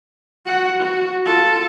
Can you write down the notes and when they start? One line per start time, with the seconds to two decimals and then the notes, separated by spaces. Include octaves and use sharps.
0.46 F#4 F#5
0.80 F#4
1.26 F4 A4